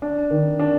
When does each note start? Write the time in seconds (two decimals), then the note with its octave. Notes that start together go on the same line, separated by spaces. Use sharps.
0.02 D4
0.30 D#3
0.59 D4